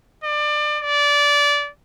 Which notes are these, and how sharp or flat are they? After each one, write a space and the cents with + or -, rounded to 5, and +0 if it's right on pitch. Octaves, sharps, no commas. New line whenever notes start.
D5 +25
D5 -20